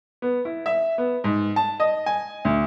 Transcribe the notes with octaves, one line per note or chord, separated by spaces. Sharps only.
B3
E4
E5
B3
G#2
A5
D#5
G#5
D2